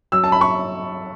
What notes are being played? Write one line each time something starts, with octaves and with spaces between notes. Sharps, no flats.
F#3 E6
A5
B5
C#6